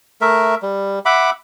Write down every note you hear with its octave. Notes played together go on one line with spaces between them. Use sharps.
A3 A#4 E5
G3
E5 F#5 B5 D6